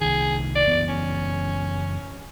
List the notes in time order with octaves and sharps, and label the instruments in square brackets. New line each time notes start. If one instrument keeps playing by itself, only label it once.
[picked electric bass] C2 D#3 [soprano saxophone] G#4
[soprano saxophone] D5
[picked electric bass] F#1 E3 B3
[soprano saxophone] C#4